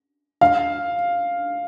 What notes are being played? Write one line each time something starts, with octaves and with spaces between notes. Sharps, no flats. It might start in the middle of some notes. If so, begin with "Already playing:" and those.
F5